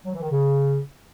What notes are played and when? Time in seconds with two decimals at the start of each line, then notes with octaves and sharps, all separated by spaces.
0.05 F#3
0.13 E3
0.21 D#3
0.30 C#3